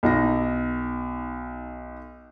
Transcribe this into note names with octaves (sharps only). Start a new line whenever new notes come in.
B1 D#4 A#6